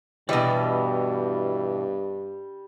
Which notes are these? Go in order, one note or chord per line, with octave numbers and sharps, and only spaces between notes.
G2 B2 E3 G3 D5 D#5